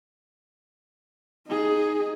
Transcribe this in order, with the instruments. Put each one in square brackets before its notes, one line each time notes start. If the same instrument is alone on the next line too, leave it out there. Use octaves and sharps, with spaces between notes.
[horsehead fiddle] D#4 G#4